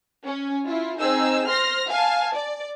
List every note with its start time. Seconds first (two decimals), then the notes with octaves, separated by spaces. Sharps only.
0.25 C#4
0.66 E4 F4
0.98 C4 D#4 G#4 E6
1.47 C5 C6 F6 A#6
1.88 F5 G#5 A5
2.33 D5